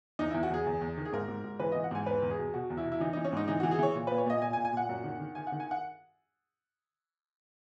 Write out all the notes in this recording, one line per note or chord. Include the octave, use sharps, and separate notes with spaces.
E2 D#4
E2 E4
F#4
E2 G#4
E2
E2
D#3
G#4
G#2 A#4
G#2
G#2
E3 B4
E3 D#5
F#5
G#2 G#5
E2 B4
E2
G#4
B2
B2 F#4
E2
E4
B2
E4
E3 D#4
E3 D#4
C#4
G#2 D#4
E3 D#4
E3 F#4
G#4
E3 C#5
A#2
A#2 B4
C#5
A#2 D#5
A#2 G#5
G#5
A#2
G#5
A#2 F#5
F#2
D#3
D#3
D#3 G#5
F#5
D#3
G#5
F#5